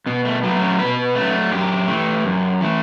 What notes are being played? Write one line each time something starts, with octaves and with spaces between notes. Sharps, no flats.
B2 B3
A3
F#3 A3 B3
C#4
B2 B4
F#3 A3
F#2 G4
E3 A3
F#2
E3 A3